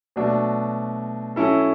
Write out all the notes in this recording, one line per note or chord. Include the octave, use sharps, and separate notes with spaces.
B2 F#3 A3 D4 F#4
F#3 C#4 E4 A4